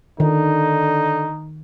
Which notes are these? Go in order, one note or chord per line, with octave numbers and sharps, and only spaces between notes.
D3 D#3 D#4